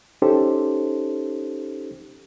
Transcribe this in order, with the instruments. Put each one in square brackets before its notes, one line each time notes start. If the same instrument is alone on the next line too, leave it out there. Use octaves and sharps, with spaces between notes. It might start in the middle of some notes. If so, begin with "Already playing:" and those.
[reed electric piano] C#4 D#4 G4 A4 C5